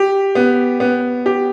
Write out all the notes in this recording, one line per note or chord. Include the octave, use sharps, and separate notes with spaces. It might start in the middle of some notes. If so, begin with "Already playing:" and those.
Already playing: G4
B3
B3
G4